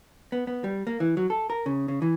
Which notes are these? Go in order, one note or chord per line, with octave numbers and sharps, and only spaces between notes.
B3
B3
G3
A#3
E3
F#3
A4
A#4
C#3
C#3
E3